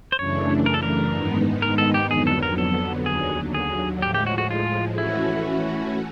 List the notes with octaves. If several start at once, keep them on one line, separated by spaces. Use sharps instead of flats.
C5
F#2 C#3 E3 A3 D4 C#5
A#4
A4
A#4
G#2 D#3 G#3 B3 D#4
A#4
A4
G4
F2 D3 F#3 B3 G#4
A4
A#4
A4
D#2 D3 F#3 G#4
G#4
A2 F3 G#3 G4
G4
F#4
F#4
F4
E3 A3 C#4 E4 F#4